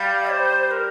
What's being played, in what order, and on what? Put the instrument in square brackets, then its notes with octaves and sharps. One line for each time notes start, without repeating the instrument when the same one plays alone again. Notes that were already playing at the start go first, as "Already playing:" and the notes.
Already playing: [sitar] G3 [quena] F5
[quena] C5
A#4